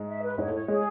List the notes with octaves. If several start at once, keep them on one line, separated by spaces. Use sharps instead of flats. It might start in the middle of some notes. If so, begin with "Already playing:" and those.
Already playing: G#2 G#3
E5
B4
G#2 G#3 C#5
A2 A3
C#5
G#3 G#4